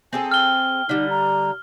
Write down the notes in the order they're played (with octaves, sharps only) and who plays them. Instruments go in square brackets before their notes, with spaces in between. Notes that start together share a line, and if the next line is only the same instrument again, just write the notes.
[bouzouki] C4 G#4 A4 [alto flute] G#5
[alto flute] G5 [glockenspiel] F6 G7
[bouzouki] D3 G3 [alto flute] D#4
[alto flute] A#5